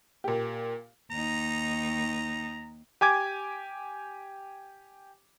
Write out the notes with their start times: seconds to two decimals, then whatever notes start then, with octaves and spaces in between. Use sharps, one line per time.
0.24 A#2 G4
1.11 D#2 D#4 A#5
3.01 G4 G#5 D6 G#6